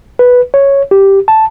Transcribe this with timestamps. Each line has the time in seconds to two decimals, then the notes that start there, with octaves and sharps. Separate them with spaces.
0.19 B4
0.54 C#5
0.91 G4
1.28 A5